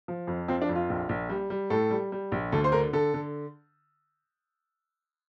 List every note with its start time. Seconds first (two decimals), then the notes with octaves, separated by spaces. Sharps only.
0.08 F3
0.27 F2
0.48 F3 C4
0.62 D4
0.69 F2
0.75 F4
0.90 A#1
1.09 A#1
1.29 G3
1.50 G3
1.70 A2 A4
1.91 G3
2.12 G3
2.32 A#1
2.52 D2 A4
2.64 C5
2.72 D3 A#4
2.93 D3 A4
3.14 D3